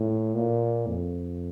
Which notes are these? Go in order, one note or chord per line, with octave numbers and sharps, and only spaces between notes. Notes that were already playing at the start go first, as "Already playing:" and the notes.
Already playing: A2
A#2
F2